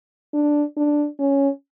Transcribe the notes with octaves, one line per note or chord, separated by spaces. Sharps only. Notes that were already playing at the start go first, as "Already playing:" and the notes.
D4
D4
C#4